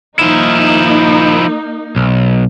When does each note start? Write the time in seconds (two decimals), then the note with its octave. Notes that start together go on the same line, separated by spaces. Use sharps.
0.19 F3 A#3 D#4 E4
1.96 B1